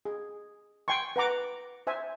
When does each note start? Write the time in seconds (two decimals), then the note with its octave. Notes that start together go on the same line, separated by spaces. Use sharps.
0.05 G#4
0.88 G5 G#5 C6 C#6
1.16 B4 F#5 A#5 D6
1.87 C5 E5 G#5